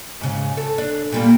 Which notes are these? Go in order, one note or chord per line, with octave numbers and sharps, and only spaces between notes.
G#2 C#3
A4
D4
A#2 G3 A#3